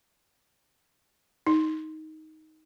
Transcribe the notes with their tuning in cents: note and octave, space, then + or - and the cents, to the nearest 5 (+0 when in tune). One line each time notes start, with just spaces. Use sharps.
D#4 +10